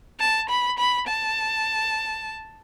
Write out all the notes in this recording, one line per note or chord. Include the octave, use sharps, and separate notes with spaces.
A5
B5
B5
A5